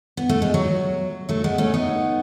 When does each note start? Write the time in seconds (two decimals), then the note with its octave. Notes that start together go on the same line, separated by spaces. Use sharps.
0.17 B3
0.29 A3
0.42 G#3
0.54 F#3
1.29 F#3 A3
1.44 G#3 B3
1.58 A3 C#4
1.74 B3 D#4